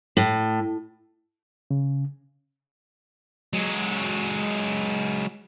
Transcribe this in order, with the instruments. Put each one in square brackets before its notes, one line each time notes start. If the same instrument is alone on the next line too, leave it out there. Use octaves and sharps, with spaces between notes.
[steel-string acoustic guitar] A2
[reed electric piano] C#3
[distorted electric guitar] F#3 G#3